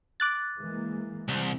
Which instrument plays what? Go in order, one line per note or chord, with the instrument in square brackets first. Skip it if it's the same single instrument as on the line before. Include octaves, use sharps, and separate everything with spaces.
[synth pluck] D6 F#6 A6
[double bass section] E3 G#3 A#3
[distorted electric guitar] C2 [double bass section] E3 C4